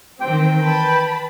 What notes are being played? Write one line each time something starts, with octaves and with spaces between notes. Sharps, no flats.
D#3 E3 C4 G5
B4 A5 B5